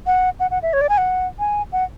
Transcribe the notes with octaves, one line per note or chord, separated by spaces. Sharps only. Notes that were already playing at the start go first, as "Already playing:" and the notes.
F#5
F#5
F#5
E5
C#5
D5
G#5
F#5
G#5
F#5